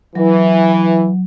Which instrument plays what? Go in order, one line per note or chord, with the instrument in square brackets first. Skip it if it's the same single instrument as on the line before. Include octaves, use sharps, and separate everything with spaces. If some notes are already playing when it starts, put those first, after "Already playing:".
[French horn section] E3 [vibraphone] F#3